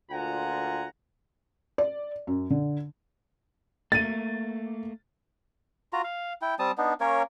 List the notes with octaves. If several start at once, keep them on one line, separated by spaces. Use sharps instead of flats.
D2 A#2 F4 F#5 G#5 A#5
D5
F#2
D3
A3 A#3 A6 D#7
F4 F#4 A#5
F5
E4 G5
G3 C4 A5 D#6
B3 D4 D#4
A#3 C#4 A#4 C#5